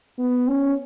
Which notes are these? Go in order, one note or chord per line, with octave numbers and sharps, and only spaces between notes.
B3
C#4